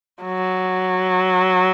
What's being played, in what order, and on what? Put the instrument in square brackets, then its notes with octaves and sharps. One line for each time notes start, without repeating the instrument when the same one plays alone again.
[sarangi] F#3